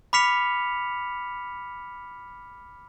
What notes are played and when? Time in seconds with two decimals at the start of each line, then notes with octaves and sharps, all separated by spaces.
0.13 B5 D6 F6 B6 C#7 F7